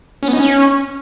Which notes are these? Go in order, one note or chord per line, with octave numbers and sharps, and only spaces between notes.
C#4
B3
D#4
C#4